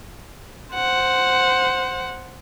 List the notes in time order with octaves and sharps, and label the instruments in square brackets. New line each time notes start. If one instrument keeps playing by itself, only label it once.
[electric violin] C5 F#5